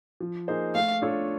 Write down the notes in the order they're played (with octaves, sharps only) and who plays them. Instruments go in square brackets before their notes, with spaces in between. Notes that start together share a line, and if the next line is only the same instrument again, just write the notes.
[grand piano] F3
A#3 D#4 G#4 C5
[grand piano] A3 [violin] F5
[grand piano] D4 F4 A4 C#5